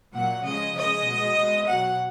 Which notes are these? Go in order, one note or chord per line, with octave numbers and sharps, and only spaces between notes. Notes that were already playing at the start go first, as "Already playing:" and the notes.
A#2 F#3 F#5
C#3 F3 G#3 D#5
C#3 G#3 D#5
B2 G#3
B2 G#3
B2 F#3 F#5